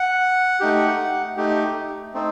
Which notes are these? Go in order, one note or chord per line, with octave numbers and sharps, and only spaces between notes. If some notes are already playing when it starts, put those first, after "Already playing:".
Already playing: F#5
A3 D#4 G4
A3 D#4 G4
A3 C4 D#4